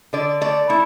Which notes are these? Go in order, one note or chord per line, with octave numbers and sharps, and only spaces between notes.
D3 D5
A3 D5
A3 E4